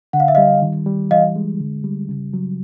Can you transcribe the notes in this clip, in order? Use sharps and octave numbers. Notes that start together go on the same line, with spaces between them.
D3 F#5
F5
E5
G3 D#5 F5
D#3
G3
E3 D#5 F5
G#3
D3
G3
C#3
F#3